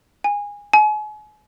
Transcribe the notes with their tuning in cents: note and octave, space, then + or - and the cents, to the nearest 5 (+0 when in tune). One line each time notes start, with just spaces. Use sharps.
G#5 -20
G#5 +40